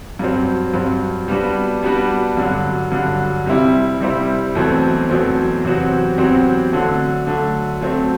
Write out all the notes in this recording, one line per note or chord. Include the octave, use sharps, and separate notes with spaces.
G2 F#3 C4
G2 F#3 C4
G3 B3 D4 F#4
G3 B3 D4 F#4
G2 D3 F#3
G2 D3 F#3
C3 G3 C4 E4
C3 G3 C4 E4
E2 B2 F#3 A3 C4
E2 B2 F#3 A3 C4
E2 C3 F#3 C4 F#4
E2 C3 F#3 C4 F#4
D3 F#3 A3
D3 F#3 A3
F#3 A3 C4